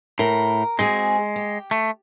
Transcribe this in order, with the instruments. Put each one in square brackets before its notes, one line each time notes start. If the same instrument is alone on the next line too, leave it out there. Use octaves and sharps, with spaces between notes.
[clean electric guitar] A2 [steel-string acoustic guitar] A#4
[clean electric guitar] G#3 [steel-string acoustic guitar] C4 F#4 G#4
[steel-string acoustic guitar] G4
[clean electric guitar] A3